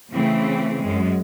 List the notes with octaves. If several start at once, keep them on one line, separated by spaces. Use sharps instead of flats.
C#3 E3 A3 C4
F#2 G#3